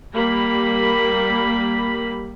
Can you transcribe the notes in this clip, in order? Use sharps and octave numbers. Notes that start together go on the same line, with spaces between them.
G3 A#3 B5